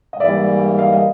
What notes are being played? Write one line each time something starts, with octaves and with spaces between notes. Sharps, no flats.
D#5
G#2 E3 G3 A#3 D5 E5
D#5 F5
D#5 F5